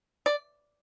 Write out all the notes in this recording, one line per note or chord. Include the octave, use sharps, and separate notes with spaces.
D5